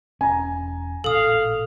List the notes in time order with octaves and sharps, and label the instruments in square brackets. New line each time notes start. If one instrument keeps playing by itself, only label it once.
[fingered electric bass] E1 C#4 [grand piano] G#5 A#5
[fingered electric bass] A1 A#2 [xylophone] A4 D#6 [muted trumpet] F5